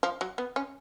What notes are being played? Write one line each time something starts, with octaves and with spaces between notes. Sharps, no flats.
F3
F#3
B3
C#4